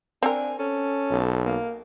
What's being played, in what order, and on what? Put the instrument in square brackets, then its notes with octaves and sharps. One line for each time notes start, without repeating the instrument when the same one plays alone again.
[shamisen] C4 A#4 [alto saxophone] D4 [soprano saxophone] G#5
[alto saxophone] C#4 [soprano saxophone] A4
[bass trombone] B1
[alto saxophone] A#3